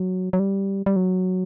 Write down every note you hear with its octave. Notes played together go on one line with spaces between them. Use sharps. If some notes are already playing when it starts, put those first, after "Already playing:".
Already playing: F#3
F#3
G3
G3
F#3